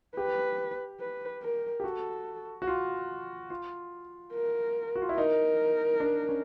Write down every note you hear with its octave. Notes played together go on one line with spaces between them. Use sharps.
G4 B4
B4
A#4
G4
F#4 A4
F#4
F4
F4
A#4
F#4
F4
E4
D#4 A#4
D4
C#4